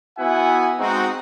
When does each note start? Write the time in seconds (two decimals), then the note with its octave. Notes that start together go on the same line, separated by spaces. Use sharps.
0.18 B3 E4 F#4 E5 F#5 G#5
0.79 G#3 C4 D#4 F#4